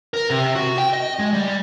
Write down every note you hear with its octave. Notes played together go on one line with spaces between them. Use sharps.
A#4
C3
F#4
G5
D#5
G#3
G3